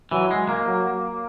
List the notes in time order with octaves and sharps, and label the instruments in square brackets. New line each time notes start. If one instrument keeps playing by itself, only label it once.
[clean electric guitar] E3 [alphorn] F#3
[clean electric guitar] G#3
A#3
[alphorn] F#3